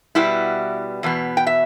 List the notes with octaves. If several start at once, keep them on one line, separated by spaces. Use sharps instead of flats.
B2 G3 B3 E4
E2 B2 B3
G5
E5